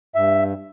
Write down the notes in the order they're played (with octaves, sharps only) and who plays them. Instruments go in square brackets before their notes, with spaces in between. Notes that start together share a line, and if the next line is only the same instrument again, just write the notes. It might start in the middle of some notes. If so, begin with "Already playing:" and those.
[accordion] G2 E5